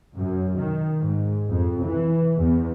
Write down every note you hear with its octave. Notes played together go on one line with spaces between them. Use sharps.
F#2
D#3
G#2
F2
E3
E2